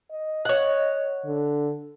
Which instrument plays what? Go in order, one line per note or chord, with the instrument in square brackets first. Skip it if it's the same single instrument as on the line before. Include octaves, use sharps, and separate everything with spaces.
[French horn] D#5
[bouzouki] C#5 F#5
[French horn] D3